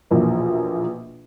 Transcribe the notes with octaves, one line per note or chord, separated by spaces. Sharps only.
A#1 E2 B2 E3 F3 A#3